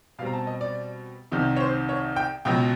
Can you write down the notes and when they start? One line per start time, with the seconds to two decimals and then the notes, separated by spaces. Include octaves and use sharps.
0.19 B2 F5
0.22 G3 C4 A#5
0.33 A5
0.47 D#5
0.61 D5
1.32 C2 C3 D#3
1.56 C#5
1.60 C5
1.89 C#5
2.16 G5
2.45 C#2 B2 F#3 G5